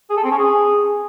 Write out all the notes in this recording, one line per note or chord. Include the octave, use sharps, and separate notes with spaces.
G#4
A4
C4
C#4
G#4